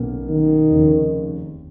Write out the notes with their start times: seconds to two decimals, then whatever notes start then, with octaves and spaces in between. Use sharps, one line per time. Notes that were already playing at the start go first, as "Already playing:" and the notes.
Already playing: B1 B2 A#3 C#4
0.30 D#3
0.70 F1 D#2 C#3